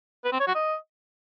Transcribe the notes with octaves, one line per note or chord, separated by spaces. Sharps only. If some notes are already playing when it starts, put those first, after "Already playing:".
B4
C4
C#5
F#4
D#5